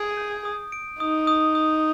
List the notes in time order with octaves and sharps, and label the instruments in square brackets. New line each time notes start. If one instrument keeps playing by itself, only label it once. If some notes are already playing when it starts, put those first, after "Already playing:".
Already playing: [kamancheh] G#4 [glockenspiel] D7
[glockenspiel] G6
D#6
D7
[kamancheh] D#4 [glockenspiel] D#6
[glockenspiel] D#6
D#6